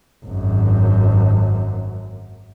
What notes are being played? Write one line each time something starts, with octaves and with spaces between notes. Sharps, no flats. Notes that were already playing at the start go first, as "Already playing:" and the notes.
G#1 F#2